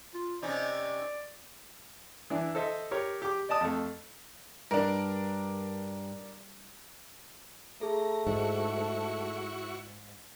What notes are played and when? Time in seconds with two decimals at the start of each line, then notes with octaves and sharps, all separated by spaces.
0.14 F4
0.42 C3 C#4 D#4 D5
2.30 E3 D4 E4
2.55 A4 C5 D#5 E5
2.91 G4 A#4 C#5
3.22 G4 D6
3.49 D5 D#5 A5 D#6
3.61 F2 A3
4.71 G2 D4 A#4
7.81 A3 G#4 A4 A#5
8.27 G#2 E4 F#4 C#6